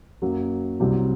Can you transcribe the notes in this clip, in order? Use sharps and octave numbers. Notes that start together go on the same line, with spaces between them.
F#2 F#3 A#3
C2 C3 F#3 C4 G4